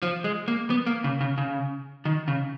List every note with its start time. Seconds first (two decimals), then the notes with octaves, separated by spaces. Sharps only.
0.02 F3
0.24 G#3
0.48 A#3
0.70 B3
0.87 A#3
1.04 C#3
1.21 C#3
1.38 C#3
2.05 D#3
2.28 C#3